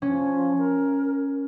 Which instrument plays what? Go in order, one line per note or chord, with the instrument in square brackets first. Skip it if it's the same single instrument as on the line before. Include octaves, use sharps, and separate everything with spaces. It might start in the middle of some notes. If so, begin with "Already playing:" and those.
[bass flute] F3 [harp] C#4
[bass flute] A#4